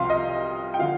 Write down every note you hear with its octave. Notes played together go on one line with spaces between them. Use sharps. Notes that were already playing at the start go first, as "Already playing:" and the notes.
Already playing: C2 C3 F3 F5 C6
D#5
G5
D3 F3 F5